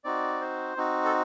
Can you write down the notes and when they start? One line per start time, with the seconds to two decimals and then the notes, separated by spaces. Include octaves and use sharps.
0.04 C4 D#4 F#4 D5
0.41 C5
0.77 C4 D#4 F#4
1.05 A4